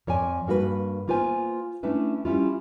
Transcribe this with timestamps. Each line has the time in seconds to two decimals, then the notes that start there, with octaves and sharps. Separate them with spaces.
0.07 F2 C#5 D5 G#5
0.47 G2 A#3 F#4 G4 B4
1.08 A#3 B3 F4 B4 C5 G#5
1.83 A3 C#4 D4 E4 B4
2.25 G3 C#4 E4 F4